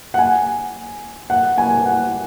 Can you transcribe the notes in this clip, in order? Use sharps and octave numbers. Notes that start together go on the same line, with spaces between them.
F#5
G#5
F#5
G#5
F#5